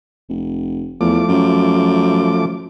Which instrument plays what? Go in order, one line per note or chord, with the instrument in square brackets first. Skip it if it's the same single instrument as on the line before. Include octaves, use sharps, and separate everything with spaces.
[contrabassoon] F1
[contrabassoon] E2 [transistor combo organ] F3 A3 D6
[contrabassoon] F#2